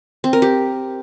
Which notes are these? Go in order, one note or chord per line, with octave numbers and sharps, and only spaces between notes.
C4
A#4
G4